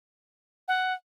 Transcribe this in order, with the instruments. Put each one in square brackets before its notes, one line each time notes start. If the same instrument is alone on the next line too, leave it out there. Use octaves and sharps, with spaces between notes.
[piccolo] F#5